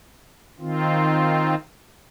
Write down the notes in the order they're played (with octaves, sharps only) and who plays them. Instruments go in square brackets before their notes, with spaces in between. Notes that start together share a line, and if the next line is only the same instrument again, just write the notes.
[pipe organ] D#3 C4 F4